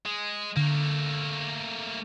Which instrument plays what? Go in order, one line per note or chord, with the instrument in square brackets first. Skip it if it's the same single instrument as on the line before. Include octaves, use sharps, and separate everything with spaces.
[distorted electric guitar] G#3
[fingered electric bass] D3 [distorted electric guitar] A3 A#3